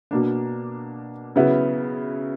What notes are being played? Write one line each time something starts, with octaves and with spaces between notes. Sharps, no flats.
B2 A#3 D4
C#3 F#3 B3 E4